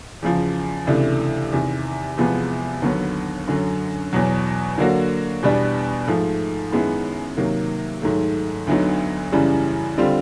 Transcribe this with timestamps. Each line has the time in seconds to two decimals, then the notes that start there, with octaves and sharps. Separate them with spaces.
0.22 E2 C#3 F3
0.87 C#2 C3 E3 A3 D4
1.52 E2 C3 D#3
2.17 E2 C3 F3 G#3 B3
2.82 D#2 D3 F#3 B3
3.48 F#2 D3 F#3
4.13 E2 B2 F#3
4.78 D3 F#3 A#3 D4 F#4
5.42 E2 B2 G3 B3 D4
6.08 G#2 F3 A3
6.72 F#2 D#3 G#3 B3 E4
7.37 C3 D#3 F#3 A#3
8.02 G#2 D#3 F#3 A3
8.67 D2 D3 F#3 B3 D#4
9.32 F#2 C#3 E3 G3
9.98 D3 G3 C4 F4